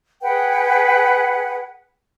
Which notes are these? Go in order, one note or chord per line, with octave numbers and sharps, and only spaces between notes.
G#4 B4 F#5 G5